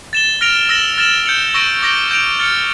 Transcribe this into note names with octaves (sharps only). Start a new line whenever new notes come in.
A6 E7 G7
F6 A#6 D7 F7
E6 A#6 E7 G7
F6 A6 E7 G7
G6 C#7 F7
C#6 E6 A#6 D7
D6 G6 A#6 D7 G7
G6 D7 F7
F6 A6 C#7